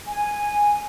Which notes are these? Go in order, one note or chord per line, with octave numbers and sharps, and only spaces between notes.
G#5